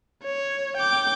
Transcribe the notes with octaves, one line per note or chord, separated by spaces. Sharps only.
C#5
G5 D6